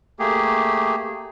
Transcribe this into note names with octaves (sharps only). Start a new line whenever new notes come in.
A3 A#3 G4 G#4